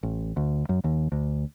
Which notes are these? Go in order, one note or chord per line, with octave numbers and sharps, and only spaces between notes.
A1
D2
F#2
D#2
D2